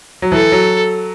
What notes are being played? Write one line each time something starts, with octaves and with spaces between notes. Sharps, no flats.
F#3
E3 A4
F#3